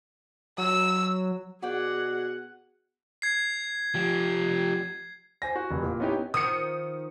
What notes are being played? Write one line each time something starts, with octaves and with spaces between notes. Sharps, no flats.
F#3 E6
B2 F#4 G#4 D5 F#5 G5
G#6 C7
F3 G4
C5 G#5 A#6
F#4
F1
A#2
B3 C#4 D#4 E4 G4
D#3 F3 D#6 C#7